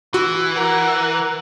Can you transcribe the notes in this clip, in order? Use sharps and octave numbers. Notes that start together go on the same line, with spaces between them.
E3 F#4
A#4 F#5